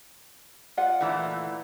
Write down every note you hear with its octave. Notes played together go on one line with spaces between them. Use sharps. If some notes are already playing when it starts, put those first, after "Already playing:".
F4 D5 F#5
A#2 E3 A3